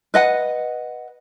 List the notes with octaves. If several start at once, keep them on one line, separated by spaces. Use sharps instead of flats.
B4 D#5 F#5